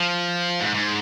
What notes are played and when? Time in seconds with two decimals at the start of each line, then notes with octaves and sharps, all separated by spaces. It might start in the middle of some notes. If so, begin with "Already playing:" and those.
Already playing: F3
0.60 G#2
0.75 G#2